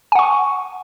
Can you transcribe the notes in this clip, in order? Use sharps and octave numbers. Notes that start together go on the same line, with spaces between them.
F#5 G#5 C#6